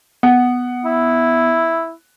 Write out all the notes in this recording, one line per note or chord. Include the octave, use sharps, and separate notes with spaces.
B3 F#5
E4